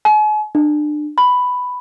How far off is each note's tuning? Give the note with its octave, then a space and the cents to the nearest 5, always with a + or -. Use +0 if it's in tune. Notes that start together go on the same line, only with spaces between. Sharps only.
G#5 +40
D4 +30
B5 +5